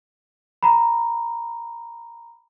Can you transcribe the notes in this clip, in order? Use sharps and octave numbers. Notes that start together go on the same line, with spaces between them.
A#5 B5